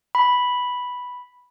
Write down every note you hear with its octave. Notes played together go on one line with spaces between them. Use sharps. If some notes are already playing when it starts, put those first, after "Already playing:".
B5